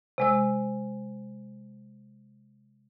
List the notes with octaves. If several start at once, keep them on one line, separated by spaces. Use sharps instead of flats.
C3 G#3 E6